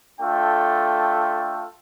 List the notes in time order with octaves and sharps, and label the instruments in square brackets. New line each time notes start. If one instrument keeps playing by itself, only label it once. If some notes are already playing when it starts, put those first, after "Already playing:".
[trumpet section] A3 D4 F4 A4 G5